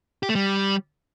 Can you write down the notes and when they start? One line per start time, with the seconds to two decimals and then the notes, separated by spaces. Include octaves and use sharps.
0.23 G4
0.29 A3
0.35 G3